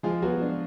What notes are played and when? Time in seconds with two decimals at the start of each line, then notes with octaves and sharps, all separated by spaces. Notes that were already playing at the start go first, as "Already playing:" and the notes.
0.03 F3 G#3 F4
0.22 F#3 B3 F#4
0.42 D4